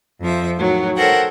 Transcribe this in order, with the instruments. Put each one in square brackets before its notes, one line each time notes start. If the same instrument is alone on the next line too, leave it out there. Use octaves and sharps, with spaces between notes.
[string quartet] F2 F3 E5
A2 D#3 F#3
A4 A#4 C5 C#5 F#5 G5